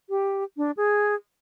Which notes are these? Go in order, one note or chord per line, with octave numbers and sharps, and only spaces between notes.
G4
D4
G#4